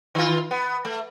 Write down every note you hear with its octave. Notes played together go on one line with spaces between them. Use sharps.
D#3 F4
B3
A3